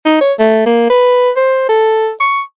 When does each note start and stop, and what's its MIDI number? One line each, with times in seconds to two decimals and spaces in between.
0.06 0.17 63
0.21 0.33 73
0.39 0.63 57
0.66 0.88 58
0.90 1.30 71
1.37 1.69 72
1.69 2.12 69
2.20 2.41 85